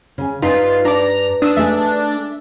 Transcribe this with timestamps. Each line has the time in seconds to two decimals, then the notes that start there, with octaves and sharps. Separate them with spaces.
0.18 C#3 G#5
0.42 G2 D#4 F4 B4
0.85 D4 D5 A#5
1.42 D4 D#6 E6
1.57 A3 D#4 G#4 E5